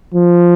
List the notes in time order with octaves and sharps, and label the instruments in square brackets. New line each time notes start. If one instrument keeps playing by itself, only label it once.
[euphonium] F3